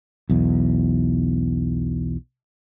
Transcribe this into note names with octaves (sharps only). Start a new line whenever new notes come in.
B1 E2